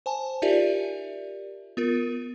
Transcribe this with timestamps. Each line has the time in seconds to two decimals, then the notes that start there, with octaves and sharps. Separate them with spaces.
0.06 C5 G#5 A5
0.42 D#4 F4 G4 A#4 D5 E5
1.77 B3 F4 A#4